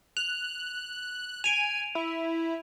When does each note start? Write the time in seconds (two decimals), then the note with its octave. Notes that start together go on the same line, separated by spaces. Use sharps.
0.17 F#6 F7
1.44 G#5 D7 D#7 F7
1.95 E4